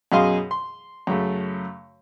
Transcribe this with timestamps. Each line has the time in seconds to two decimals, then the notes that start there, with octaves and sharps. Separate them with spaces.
0.12 F#2 B2 G#4 D#5 F5 C6
0.51 C6
1.07 F#2 C#3 A3